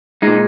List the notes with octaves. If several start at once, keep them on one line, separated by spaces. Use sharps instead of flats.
A#2 G#3 D#4